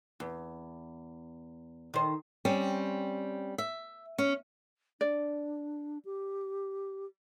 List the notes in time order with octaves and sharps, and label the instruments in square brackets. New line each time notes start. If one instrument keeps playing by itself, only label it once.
[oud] E2
D#3 C5
[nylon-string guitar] G3 C4 C#4
E5
C#4
[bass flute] D4 [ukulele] D5
[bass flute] G4